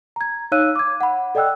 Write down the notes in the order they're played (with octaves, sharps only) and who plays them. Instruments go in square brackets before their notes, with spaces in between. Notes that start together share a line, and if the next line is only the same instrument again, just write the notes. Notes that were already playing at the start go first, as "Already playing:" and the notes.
[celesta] A#5 G#6
D#4 C#5 F5 E6 F#6 D#7
D6 G#6
F#5 B5
A4 D5 D#5 G5 E6 F#6